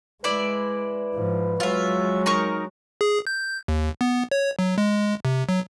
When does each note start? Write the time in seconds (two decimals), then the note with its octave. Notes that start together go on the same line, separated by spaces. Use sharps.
0.24 G#3 E4 B4 D5
1.14 G#2 F3
1.60 F#3 G#3 F4 E5
2.26 D#4 A#4 C#6
3.01 G#4
3.27 G6
3.68 D#2
4.01 B3
4.31 C#5
4.59 F#3
4.78 G#3
5.25 C3
5.49 F#3